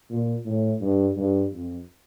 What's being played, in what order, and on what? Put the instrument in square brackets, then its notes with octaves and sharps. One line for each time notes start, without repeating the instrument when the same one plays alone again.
[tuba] A#2
A2
G2
G2
F2